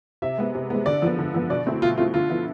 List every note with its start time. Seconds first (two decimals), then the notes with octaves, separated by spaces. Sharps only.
0.22 C3 E5
0.38 G#3 B3
0.55 C3
0.70 G#3 B3
0.86 D3 D5
1.02 F3 B3
1.19 D3
1.34 F3 B3
1.50 B2 D5
1.66 A3 C4 E4
1.82 B2 F4
1.97 A3 C4 E4 F4
2.14 D3 F4
2.30 F3 B3 E4